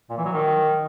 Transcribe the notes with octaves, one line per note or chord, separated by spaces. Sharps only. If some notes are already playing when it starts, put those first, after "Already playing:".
A#2
E3
F#3
D#3